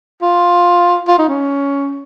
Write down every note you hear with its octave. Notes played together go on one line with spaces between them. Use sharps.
F4
F4
D#4
C#4